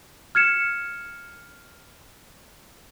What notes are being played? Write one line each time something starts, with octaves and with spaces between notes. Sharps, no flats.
F6 G#6 C#7 E7